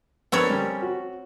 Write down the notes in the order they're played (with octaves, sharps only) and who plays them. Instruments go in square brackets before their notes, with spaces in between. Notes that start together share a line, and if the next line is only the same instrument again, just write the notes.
[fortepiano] B3 D4 A#4 [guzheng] C4 A4 C#5
[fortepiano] G3 C#4 A#4
F#4